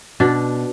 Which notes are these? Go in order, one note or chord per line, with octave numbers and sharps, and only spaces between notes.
B2 D4